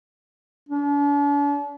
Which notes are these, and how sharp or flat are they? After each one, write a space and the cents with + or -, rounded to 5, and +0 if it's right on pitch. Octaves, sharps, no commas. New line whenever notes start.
D4 -40